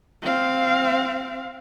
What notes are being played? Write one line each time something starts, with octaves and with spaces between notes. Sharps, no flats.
C4 F5